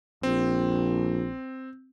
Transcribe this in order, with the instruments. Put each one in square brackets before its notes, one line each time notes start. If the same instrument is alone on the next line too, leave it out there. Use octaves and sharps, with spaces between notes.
[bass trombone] A#1 [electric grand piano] C4